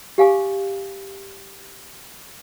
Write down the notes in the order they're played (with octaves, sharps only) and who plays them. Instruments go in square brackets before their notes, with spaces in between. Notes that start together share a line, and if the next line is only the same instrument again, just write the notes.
[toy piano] G4 F5 G#5 D6